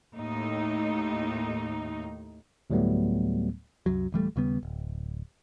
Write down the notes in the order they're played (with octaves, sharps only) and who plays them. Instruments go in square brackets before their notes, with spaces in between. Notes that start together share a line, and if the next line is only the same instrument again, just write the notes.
[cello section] D#2 A2 D#4
[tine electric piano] D2 A2 F#3 G3 A3 B3
[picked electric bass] C2 F#2 F#3
D1 E3 G3 A3
D#2 C#3 G3 B3
D1